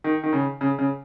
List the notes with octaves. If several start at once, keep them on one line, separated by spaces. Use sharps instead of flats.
D#3
D#3
C#3
C#3
C#3